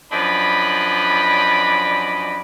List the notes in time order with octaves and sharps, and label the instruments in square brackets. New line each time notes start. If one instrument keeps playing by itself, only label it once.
[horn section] F#2 F3 D4 D5 D#5 B5